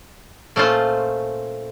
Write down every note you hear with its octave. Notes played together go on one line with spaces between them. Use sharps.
A#2 A3 C#4 F4 C5